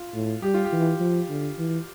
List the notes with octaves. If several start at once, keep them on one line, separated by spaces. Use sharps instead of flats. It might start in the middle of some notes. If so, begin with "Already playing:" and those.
Already playing: F4
A2
G3 G4
F4
G4
E3
F3
D3
E3